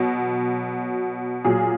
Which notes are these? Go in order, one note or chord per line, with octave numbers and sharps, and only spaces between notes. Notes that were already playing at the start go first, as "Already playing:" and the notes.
Already playing: B2 F#3
A#2 F#3 G#4